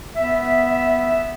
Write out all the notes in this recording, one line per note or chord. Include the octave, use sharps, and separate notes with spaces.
B3 E5